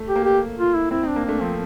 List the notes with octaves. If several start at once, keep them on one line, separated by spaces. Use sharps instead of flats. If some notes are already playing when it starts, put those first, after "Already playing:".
Already playing: A3
G4
A#3
G4
F4
E4
C4 E4
C4
D4
A#3
A3 D4
F3 C4